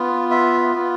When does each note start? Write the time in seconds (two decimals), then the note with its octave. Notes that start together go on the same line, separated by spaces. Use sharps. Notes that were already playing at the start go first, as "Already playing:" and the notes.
Already playing: B3 F4
0.31 E5
0.75 B3 F4